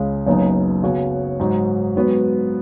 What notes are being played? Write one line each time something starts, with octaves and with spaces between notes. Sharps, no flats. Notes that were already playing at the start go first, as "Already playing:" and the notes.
Already playing: C#2 C#3 G#3
F#1 F#2 C#3 B3 D#4
C#3 B3 F#4 C#5
G#2 F#3 D#4 F#4
G#2 F#3 B3 F#4 B4